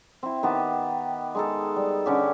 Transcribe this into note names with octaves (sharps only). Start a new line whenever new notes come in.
C4 E4
D#3 B3 G4 A5
G#3 D#4 A4
G3
D3 C#4 G4